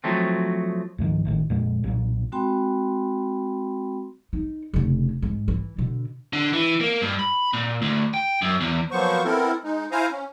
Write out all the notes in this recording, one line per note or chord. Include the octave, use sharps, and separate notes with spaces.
F3 F#3 A3 C4
C#2 G#2 D#3 F3
G#1 A2 D#3
F2 A#2 G#3
B1 A#2
G#3 C4 F#4 G5 B5 C6
D#4
F1 C#3
G#2
E3
B2 D3
D3
E3
A#3
G2
B5
A#2
D2
G5
F#2
E2
F3 F#3 A#3 B3 C5 C#6
B3 C4 E4 A4 A#4
G#3 D#4
E4 C5 F5 G#5 A#5
C#4